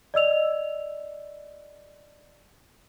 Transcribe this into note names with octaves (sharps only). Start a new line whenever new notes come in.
D5 D#5 E6 F7